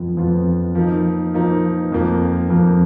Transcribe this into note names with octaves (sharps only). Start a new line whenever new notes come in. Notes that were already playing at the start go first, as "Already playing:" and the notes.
Already playing: F2 F3 B3 F4
F2 F3 B3 F4
F3 A#3 D#4
F3 A#3 D#4
F2 F3 A#3
F2 F3 A#3